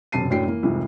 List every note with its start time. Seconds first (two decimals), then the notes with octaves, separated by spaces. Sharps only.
0.12 E1 F#2 C3 A5 C7 D#7
0.30 F#2 A2 F#3 D4 G5 C7
0.47 E3 A#3
0.63 C2 F2 G#2 E3 F3